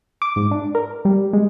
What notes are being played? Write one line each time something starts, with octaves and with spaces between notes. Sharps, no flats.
D6
G#2
D4
A#4
G3
G#3